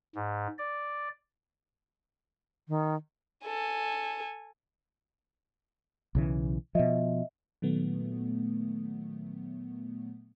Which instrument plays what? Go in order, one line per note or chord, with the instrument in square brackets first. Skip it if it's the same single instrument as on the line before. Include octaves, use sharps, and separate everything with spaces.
[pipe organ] G#2
D5
[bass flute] D#3
[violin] A4 G#5
[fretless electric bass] B1 C#3 E3
[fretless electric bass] B2 F3 [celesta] D#5 E5
[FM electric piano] A#2 D#3 F#3 A3 B3